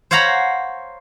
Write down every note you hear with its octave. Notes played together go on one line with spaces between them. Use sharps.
C5 C#5 F5 F#5 A#5 B5